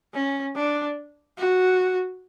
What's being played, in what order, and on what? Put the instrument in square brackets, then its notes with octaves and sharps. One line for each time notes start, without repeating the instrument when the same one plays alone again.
[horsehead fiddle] C#4
D4
F#4